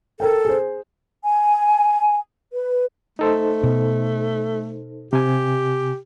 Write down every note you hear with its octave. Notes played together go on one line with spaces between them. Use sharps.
A4 A#4 G5
G#4 C5
G#5
B4
A3 D#4 A4 C5
B2
C3 G4 G#5